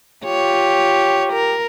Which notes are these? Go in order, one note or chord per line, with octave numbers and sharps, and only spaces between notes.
F4 G4 C#5
A#4